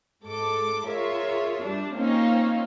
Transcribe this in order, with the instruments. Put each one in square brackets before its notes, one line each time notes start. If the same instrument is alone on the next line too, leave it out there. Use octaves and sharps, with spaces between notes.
[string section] G#2 G#3 A4 D6
F4 G#4 A#4 C#5 E5
G3 D4
A#3 C4 C#4 D#4 F4